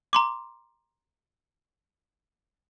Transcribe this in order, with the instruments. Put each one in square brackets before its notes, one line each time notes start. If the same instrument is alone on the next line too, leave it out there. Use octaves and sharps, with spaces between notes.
[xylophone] A#5 C6 D6